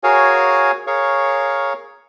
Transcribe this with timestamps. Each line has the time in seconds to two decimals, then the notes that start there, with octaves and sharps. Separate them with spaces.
0.04 F#4 G#4 A#4 C#5 F5 G#5
0.87 G#4 A#4 C#5 F5 C#6